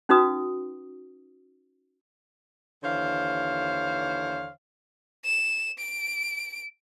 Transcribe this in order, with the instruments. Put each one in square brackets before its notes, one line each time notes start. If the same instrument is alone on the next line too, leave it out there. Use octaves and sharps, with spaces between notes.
[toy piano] C#4 D#4 F#4 B4 D#6
[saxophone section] D#2 D3 E3 C5 C#5 F5
[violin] E7
D7